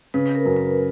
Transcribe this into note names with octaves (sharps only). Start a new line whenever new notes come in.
C#3 B4
B4
A#4
F#2
B4